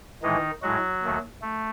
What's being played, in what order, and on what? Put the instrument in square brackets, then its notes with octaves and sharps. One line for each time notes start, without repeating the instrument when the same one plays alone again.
[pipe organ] A2 D#3 E3 G#3 D#4
A2 F#3 G#3 F#4
D#2 D#3 A3
A3